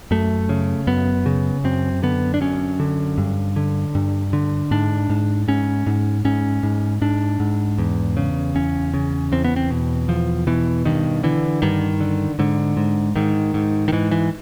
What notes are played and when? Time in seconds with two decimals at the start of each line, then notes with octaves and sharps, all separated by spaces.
0.11 F#2 A3
0.49 C#3
0.87 F#2 B3
1.26 C#3
1.64 F#2 C4
2.03 D3 B3
2.34 D4
2.41 F#2 C#4
2.80 D3
3.18 G2
3.56 D3
3.95 G2
4.33 D3
4.71 G#2 D4
5.10 G#2
5.48 G#2 C#4
5.86 G#2
6.25 G#2 C#4
6.63 G#2
7.01 G#2 D4
7.40 G#2
7.78 E2
8.17 C#3
8.55 E2 C#4
8.94 C#3
9.32 E2 C4
9.44 B3
9.56 C4
9.70 B2
10.08 E2 F3
10.47 B2 E3
10.85 G2 D#3
11.23 D3 E3
11.62 G2 D#3
12.00 D3
12.39 G#2 D3
12.77 G#2
13.16 G#2 D#3
13.54 G#2
13.88 D#3
13.92 G#2 E3
14.11 E3